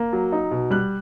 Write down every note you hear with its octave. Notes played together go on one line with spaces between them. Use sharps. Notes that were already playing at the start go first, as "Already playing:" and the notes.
Already playing: A#3
F#3
D#4
B2
G3 F#6